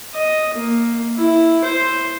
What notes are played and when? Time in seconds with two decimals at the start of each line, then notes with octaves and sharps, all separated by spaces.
0.15 D#5
0.54 A#3
1.17 E4
1.64 C5